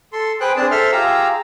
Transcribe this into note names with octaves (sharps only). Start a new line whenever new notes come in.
A4 C6
G#4 B4 C5 G5 F#6
C4 D4 G#4 A5
A4 C5 E5 C6 F6
F4 G4 G#4 F5 A#5 E6